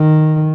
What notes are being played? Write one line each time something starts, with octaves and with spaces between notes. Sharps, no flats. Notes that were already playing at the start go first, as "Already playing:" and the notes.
Already playing: D#3